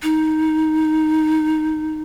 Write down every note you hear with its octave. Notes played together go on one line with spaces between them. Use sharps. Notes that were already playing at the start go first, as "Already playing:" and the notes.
D#4